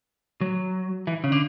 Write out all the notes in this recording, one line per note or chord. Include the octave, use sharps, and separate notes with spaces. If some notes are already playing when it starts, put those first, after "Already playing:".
F#3
E3
C#3
D3